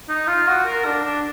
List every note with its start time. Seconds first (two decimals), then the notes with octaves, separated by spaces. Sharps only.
0.08 D#4
0.27 F4
0.47 F#4
0.66 A#4
0.85 D4
1.05 D4